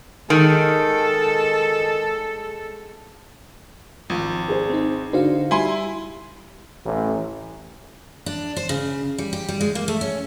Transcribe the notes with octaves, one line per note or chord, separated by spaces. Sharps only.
D#3 G#3 A4
G#1 F3
G#4 C5
C4 D#4
D3 D#4 F#4 C5 F5
G3 E4 G#5 B5 C6
A1
D4
C5
C#3
G3
G4
G3
G#3
A#3
A3
C#4